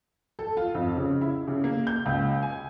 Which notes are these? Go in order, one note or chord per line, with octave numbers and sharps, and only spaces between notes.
A4
F4
F2
C#3
E4
C#3
A#3
G6
C#2
G#5